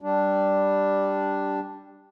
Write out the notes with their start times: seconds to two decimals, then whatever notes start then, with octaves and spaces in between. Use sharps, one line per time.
0.01 G3 D4